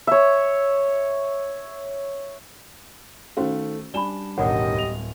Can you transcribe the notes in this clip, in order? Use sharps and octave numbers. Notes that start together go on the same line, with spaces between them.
C#5 E5
D#3 A3 C#4 F#4 C5 F5
G3 D4 D5 G#5 B5 E7 G7
E1 A1 D#3 G4 C#5 D#5 F#5
D1 F7